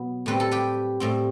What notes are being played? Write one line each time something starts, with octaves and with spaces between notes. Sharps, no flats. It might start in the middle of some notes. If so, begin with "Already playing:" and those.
Already playing: B2 F#3 B3
A2 G3 C4 B4
A4
G4 B4
A2 G3 C4